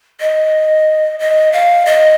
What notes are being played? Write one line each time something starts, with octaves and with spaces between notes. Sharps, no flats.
D#5
D#5
F5
D#5